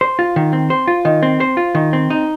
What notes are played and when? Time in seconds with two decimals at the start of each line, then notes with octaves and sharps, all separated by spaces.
0.01 C5
0.19 F4
0.36 D#3
0.53 C4
0.70 C5
0.88 F4
1.05 D#3
1.23 C4
1.40 C5
1.57 F4
1.75 D#3
1.93 C4
2.10 D#4